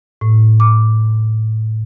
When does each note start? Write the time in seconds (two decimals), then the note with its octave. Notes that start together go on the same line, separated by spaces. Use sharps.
0.21 A2
0.60 D6